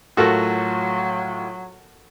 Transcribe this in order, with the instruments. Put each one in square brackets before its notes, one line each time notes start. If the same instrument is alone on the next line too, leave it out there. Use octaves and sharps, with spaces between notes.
[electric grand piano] A2 F4 [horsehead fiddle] F#3 [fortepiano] F#4 A4 A#4